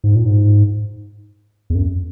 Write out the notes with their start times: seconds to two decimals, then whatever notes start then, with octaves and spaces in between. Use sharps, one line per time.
0.04 G#2
0.15 A#2
0.26 G#2
1.70 E2
1.75 F#2